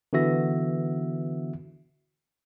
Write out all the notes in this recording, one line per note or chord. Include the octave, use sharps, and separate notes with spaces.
D3 E3 B3 F#4 E5 A#6